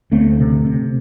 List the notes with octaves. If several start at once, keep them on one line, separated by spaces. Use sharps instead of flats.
D2 A3 C4
C3
C3